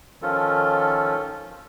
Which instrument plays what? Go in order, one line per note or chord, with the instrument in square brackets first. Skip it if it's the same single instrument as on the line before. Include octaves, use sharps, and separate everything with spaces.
[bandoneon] D#3 F3 C#4 F4 A4